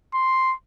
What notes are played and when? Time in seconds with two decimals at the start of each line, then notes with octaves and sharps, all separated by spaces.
0.14 C6